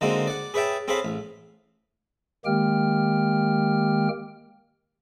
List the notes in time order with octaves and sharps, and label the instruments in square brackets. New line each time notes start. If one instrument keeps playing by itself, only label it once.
[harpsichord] D3 G#3 A#3 C4 D#4 F#4
D5 F#5
G#4 B4 C#5 E5 G5 A5
C4 G#4 A4 C#5 F5 B5
A1
[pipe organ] D#3 G#3 A#3 G4 G5 F6